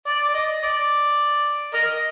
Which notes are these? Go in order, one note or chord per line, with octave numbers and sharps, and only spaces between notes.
D5
D5
D#5
D5
A#4 D#5